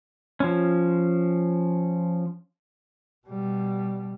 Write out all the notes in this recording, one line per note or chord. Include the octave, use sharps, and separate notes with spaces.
F3 C#4
B2 G3